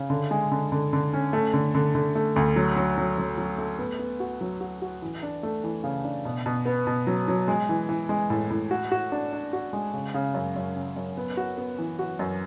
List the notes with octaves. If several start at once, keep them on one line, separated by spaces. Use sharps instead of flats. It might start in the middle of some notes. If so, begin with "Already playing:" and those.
Already playing: C#3
D3
G#3
D3
D3
D3
C#4
A3
D3
D3
D3
A3
D2
F#3
F#3
F#3
F#3
F#3
A3
B3
B3
F#4
F#3
F#4
F#4
E3
D4
A3
E3
C#3
D4
B2
B2
B3
B2
F#3
F#3
G#3
E3
E3
G#3
A2
A2
F#4
F#4
D4
D4
F#4
G#3
C#3
C#3
F#2
F#2
C#3
F#2
B3
F#4
B3
E3
F#4
F#2